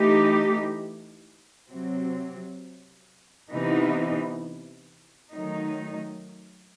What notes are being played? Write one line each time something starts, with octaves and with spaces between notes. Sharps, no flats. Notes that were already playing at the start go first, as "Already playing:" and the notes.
Already playing: E3 A3 D#4 G4
C3 F#3 C4
C3 E3 B3 D#4
D#3 F#3 A3 D#4